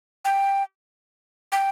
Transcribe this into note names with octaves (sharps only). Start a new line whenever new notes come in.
G5
G5